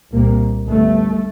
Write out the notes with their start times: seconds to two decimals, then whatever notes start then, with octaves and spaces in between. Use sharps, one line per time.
0.12 C2 A#2 A#3
0.66 G1 G2 A3